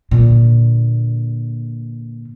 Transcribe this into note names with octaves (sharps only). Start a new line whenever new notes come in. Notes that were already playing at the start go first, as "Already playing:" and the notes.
A#2 D3